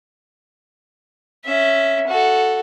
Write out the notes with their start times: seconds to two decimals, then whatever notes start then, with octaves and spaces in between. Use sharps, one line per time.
1.45 C#4 E5
2.07 F#4 A4